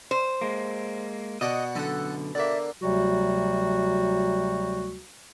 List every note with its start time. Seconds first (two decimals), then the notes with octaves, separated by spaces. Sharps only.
0.11 C5
0.41 G#3 A#3
1.41 B2 F#4 D5 D#5 F#5
1.75 F#2 D3 A4 F#5
2.35 D3 A#3 D5 E5
2.82 D2 C3 F#3 G3 F#4